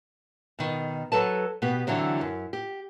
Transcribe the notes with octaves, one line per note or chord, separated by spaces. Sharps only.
B2 D#3
F#3 A4 B4 A5
B2 B3 G4
D3 E3 F#3 C4
F#2
G4